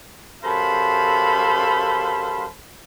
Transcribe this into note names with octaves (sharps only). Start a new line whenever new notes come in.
F#2 G4 A4 C5 F5 B5